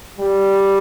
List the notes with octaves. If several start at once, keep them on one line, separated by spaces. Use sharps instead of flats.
G3